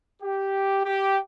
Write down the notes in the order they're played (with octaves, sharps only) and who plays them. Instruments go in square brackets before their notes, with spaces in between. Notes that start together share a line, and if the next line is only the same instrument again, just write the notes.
[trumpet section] G4
G4